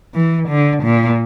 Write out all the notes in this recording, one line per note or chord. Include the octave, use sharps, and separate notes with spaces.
E3
D3
A#2